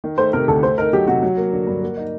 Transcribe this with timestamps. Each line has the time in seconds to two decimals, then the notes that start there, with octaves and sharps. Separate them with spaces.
0.04 D#3
0.18 A3 C5
0.33 C3 A#4
0.48 D2 A4
0.63 A3 C5
0.78 D#4 A#4
0.93 F#3 G4
1.07 C3 F#4
1.23 F#3
1.37 A#3
1.53 D3
1.67 G2
1.82 A#3
1.97 D#4